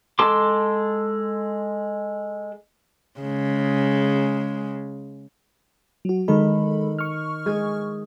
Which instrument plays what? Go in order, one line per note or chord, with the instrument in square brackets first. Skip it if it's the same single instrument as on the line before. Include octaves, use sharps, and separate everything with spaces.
[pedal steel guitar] G#3 A4 A5 C6 D6
[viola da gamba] C#3 G#3
[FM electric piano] F#3 F#4
[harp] D#3 [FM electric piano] G#3 A4 B5
[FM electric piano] C#6 F6
[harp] G#3 G#4 G#6